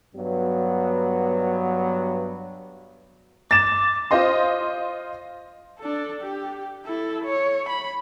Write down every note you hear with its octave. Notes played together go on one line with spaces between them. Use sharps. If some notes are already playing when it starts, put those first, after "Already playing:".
G2 F#3 B3
D6 A6 E7
F4 C5 D#5 C6
D4 A4
G4
E4 A4
C#5
B5